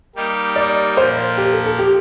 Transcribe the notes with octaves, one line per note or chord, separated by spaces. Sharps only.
G3 A#3 D#4 G4
D5
A#2 F3 A#3 C5
G4
A4
A4
G4